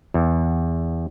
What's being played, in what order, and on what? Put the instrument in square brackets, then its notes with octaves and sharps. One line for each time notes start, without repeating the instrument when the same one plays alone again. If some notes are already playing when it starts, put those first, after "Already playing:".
[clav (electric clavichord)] E2